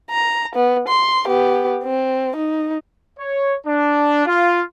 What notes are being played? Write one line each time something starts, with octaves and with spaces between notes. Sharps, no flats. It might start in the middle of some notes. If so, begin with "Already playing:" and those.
A#5
B3
C6
B3 G4
C4
D#4
C#5
D4
F4